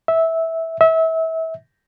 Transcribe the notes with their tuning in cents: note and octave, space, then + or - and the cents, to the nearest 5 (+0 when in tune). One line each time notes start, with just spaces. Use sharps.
E5 -15
E5 -30